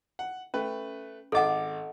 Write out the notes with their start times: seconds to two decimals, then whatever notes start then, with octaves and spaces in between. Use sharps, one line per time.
0.19 F#5
0.54 A3 C#4 B4
1.32 G#1 A4 D#5 F#5 D6